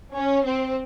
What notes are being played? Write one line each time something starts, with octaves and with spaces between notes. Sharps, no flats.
C#4
C4